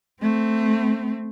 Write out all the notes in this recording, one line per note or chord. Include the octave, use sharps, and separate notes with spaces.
A3 C4